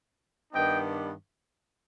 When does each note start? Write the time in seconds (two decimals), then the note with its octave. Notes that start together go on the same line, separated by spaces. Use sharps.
0.52 G2 D#3 G3 B3 D4 D#5 G5